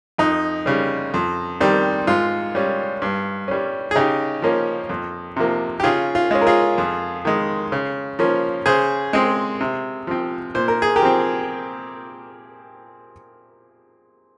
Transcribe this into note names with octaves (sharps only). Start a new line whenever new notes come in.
F2 D#4
C#3 G3
F2
D#3 G3 C4
G#2 F4
G3 C#4
G2
G3 C#4
G#4
C#3 D#4 G4
F3 A#3 C#4
F2
C3 F3 A#3
G4
C#3 F4 G#4
F4
G#3 C#4
A#4
F4 G#4
F2
D#3 G#3
C#3
F3 A#3 C#4
C#3 G#4 C5
G#3 C4
C3
F3 C4
A#2 C5
A#4
G#4
G4 A#4
F3 C4